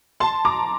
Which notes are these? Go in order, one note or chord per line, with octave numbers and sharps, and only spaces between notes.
A5 C6
A#5 D6